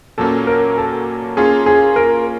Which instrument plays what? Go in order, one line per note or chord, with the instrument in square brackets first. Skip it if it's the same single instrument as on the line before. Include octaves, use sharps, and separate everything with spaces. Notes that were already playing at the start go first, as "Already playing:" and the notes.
[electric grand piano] A#2 F#3 A#3 C#4 [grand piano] A4
[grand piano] A#4
A4
[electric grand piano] A#3 C#4 F4 [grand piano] G#4
[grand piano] G#4
A#4